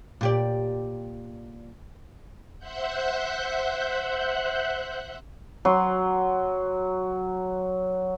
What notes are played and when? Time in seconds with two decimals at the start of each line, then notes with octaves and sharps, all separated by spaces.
0.21 A#2 G4 D5
2.59 C5 E5 F#5 F#6 G6
5.65 F#3 C6